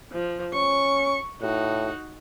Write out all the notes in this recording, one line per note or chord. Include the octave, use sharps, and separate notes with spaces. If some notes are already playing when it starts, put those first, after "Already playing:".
F3
C#4 C#6
A2 D#4 F#4